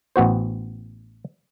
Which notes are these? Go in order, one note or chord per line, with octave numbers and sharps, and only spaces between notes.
A1 B3 F#4 C5